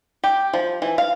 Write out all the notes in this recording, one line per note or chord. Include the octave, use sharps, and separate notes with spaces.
G4
F3
E3
F5